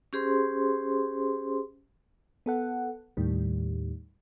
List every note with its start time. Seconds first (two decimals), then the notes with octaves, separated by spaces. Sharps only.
0.13 C#4 G4 G#4 C5 C6
2.46 B3 A4 F#5
3.17 D#2 A2 D#3 G3